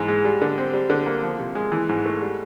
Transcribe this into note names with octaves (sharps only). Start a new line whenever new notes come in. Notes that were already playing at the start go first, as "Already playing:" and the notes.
Already playing: G#2 E3
G#3
G3
D3
C4
G3
D3
A#3
F3
C3
G#3
E3
G#2
A3
G3